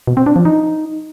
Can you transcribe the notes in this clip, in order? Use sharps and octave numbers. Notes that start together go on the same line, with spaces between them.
B2
C4
D4
F3
D#4